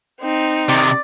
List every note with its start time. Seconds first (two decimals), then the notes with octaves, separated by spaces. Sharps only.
0.21 C4 D#4
0.69 C3 D#3 D5